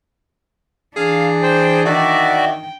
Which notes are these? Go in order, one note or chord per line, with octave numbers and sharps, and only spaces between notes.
E3 D4 G#4 F5
C5 G5
D#3 F#4 D5 E5
G5